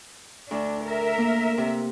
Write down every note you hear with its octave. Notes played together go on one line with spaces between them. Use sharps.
D2 D4
A#4 E5
A#3
C3